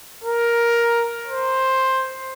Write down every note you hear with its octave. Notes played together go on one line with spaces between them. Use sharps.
A#4
C5